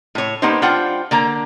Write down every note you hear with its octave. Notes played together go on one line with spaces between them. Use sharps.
A2 C#5
A#3 B3 D4 D#4 G4 C5
G3 D4 F4 C5 F#5 G5
D3 A#3 A#5